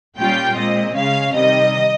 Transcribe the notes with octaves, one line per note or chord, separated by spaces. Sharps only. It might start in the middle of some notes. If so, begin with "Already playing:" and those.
A#2 G3 C#4 F4 G5
A#2 G#3 C4 D#5
C#3 G#3 C#4 F5
C3 D#3 G3 D#5